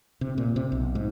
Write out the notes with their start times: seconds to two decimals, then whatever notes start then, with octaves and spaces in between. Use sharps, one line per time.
0.21 C3
0.38 A#2
0.56 C3
0.72 B1
0.95 G#2